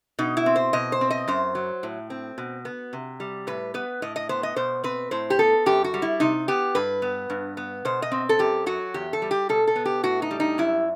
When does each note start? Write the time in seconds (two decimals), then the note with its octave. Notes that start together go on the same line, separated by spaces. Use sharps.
0.19 B2 D#4
0.37 E4
0.46 C4
0.56 C5
0.73 B2 D#5
0.92 C5
1.01 C4
1.10 D#5
1.28 F#2 C5
1.55 F#3
1.83 A2
2.10 C4
2.38 B2
2.65 B3
2.93 C3
3.20 G3
3.47 A2 B4
3.74 B3 B4
4.02 A2 D#5
4.16 D#5
4.29 B3 C5
4.43 D#5
4.56 B2 C5
4.84 C4 B4
5.11 A2 C5
5.30 G4
5.39 B3 A4
5.66 F#2 G4
5.84 F#4
5.94 G3
6.02 E4
6.20 C3 D#4
6.48 B3 G4
6.75 G2 B4
7.02 B3
7.30 G2
7.57 B3
7.85 B2 C5
8.02 D#5
8.12 C4
8.29 A4
8.39 F#2 G4
8.66 F#3 F#4
8.94 E2 G4
9.13 A4
9.22 G3
9.31 G4
9.49 B2 A4
9.67 A4
9.76 B3
9.85 G4
10.03 A2 F#4
10.22 D#4
10.31 G3
10.40 D#4
10.58 F#2 E4